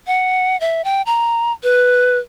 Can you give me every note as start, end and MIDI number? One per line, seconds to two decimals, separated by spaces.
0.07 0.59 78
0.61 0.84 76
0.84 1.02 79
1.06 1.52 82
1.63 2.18 71